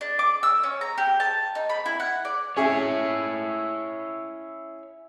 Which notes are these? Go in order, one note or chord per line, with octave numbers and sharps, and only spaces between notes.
D4
D6
E6
C#4
A#5
G4
A5
D#4
B5
E4
F#5
D5
C#4 E4 G#4 C#5 E5